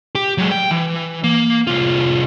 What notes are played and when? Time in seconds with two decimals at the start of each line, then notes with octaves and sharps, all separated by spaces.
0.15 G4
0.38 F#3 G#3
0.52 G5
0.71 E3
1.24 A#3
1.67 C2 F4